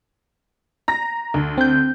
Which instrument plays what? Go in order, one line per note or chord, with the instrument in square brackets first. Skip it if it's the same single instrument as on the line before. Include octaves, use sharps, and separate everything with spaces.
[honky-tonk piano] A#5 A#6
D2
[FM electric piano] C4 G6